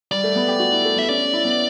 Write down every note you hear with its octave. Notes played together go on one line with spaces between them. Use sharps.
G3 D5
A3
B3
G4
F#4
E4
A3
B3 E5
C#4 D5
E4
B3